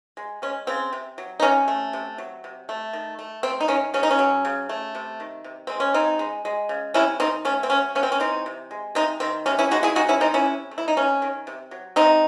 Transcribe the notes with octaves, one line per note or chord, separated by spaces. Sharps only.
G#3
G#3 C#4
C#3 C4
C3
F#3
D#4
C3 C#4
A3
C3
F#3
C3
A3
D#3
A3
A3 C4
D#4
D#3 C#4
C#3 C#4
D#4
C#4
F#3
C#3
A3
C3
D#3
C3
G#3 C4
C#4
C#3 C4 D#4
G#3
G#3
C#3
C3 C#4 E4
D#3 C4 D#4
A3 C#4
C4
F#3 C#4
C3 C#4
C4
C#4
E3 C4 D#4
C3
G#3
C3 C4 D#4
D#3 C4
C3 C#4
C#4 E4
G#3 D#4 F#4
E4 G#4
C3 D#4 F#4
C#4 E4
D#3 C4 D#4
C#4 E4
C3
A3
E4
D#4
C3 C#4
D#3
C3
F#3
C3 C4 D#4